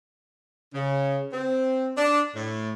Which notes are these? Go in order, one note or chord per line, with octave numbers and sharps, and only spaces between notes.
C#3
C4
D4
A2